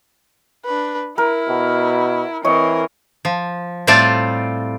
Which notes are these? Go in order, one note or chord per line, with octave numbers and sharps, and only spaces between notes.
D4 B4
E4 A#4
B2
E3 C4 A#4 C#5 D#5
F3
A2 G3 C4 F4 D5 A5